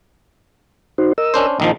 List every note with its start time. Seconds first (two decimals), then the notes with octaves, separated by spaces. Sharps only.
0.98 D#4 F#4 C5
1.18 A#4 D#5 E6
1.34 C#4 D4 C5
1.60 A#1 D#3 F3 D#5